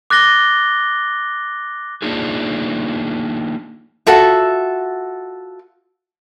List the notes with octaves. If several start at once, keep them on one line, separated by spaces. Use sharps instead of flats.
D6 F#6 A6 A#6 G7
A#3 D4 D#4 F4 G#4
F4 F#4 A4 E5